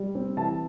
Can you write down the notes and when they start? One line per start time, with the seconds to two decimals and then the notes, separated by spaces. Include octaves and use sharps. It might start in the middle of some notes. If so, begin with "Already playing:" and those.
Already playing: G3
0.15 C4
0.37 E3 A5